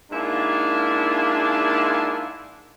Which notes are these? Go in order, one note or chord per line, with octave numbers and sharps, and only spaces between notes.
G#2 A#3 D4 E4 F4 G#5